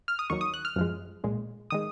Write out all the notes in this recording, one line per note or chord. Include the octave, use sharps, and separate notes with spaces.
F6
D#6
D#2 D#3 F#3 C#6
D#6
F#6
F6
F#2 F3 G#3
B1 A#2 G#3
D#3 G#3 D#6